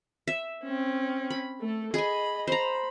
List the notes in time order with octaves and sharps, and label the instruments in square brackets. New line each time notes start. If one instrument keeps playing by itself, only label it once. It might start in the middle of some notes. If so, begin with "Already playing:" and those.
[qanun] E5
[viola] C4 C#4
[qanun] B5
[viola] A3 A4
[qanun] G#4 G#5 [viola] D#5 B5
[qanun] C5 A#5 [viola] B5